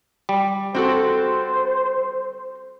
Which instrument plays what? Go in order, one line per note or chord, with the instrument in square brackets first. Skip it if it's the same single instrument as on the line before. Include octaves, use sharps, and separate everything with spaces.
[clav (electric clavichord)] G3
[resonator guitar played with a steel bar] C4 F#4 A4 [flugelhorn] C5